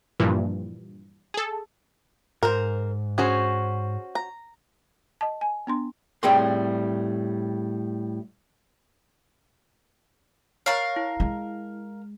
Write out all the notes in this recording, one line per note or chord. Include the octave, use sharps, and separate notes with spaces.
G2 A#2 E3 F3
G#4 A4
G#2 A#4 C5
C#4 F#4 G#4 C5
A#5
D#5 A5
G#5
B3 D4 C6
A2 G3 C4 G#4 G5 C6
A#4 C#5 F5 C#6 A6
E4
G#3